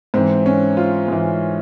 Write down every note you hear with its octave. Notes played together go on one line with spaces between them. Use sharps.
G#2 E3 C4
C#4
F4
G#2 E3